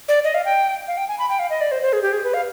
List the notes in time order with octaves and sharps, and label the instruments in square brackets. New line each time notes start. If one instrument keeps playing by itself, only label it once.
[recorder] D5
D#5
F5
G5
F5
G5
G#5
B5
G5
F5
D#5
D5
C5
C5
G#4
G4
G#4
B4
F5